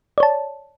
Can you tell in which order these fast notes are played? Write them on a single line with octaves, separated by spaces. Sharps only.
D5 C#5 A5